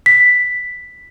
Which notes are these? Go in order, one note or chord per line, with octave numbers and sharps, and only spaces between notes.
B6